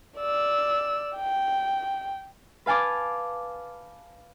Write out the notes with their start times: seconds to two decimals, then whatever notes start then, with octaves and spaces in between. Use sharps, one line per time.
0.18 D5 E6
1.17 G5
2.66 B4 F5 G#5 A5 D6